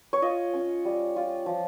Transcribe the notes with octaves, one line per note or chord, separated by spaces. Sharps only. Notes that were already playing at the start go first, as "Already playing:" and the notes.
C#5
F4 D#5
C#4
G3
F4
F3